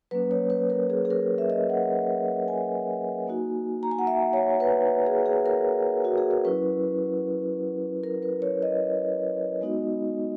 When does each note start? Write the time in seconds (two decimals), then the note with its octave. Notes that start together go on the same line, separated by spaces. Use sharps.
0.11 F#3 A#3 C#4 B4
0.31 C#5
0.50 B4
0.70 A#4
0.90 G#4
1.05 G#4
1.10 A#4
1.38 E5
1.50 D#5
1.70 F#5
2.48 G#5
3.27 A#3 D#4 F#4
3.83 A#5
3.91 G#5
3.99 F#5
4.07 E5
4.33 C#5
4.60 B4
5.06 G#4
5.26 G#4
5.46 A#4
6.05 F#4
6.18 G#4
6.31 A#4
6.45 F#3 C#4 E4 B4
8.04 A#4
8.23 B4
8.42 C#5
8.63 D#5
9.61 G#3 B3 D#4 F#4